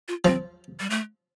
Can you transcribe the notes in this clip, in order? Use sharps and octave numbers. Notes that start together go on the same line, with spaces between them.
F4
F3 C4
G3
A3